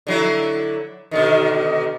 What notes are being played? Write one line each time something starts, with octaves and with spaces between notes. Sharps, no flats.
D3 F#3 E4
B2 D3 D#3